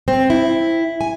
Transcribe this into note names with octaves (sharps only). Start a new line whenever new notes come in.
C4
E4
G#5